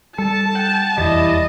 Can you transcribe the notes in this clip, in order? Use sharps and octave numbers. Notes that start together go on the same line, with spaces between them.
G3 A4 A5
F#5 G5
F1 E2 E3 G3 E4 D#5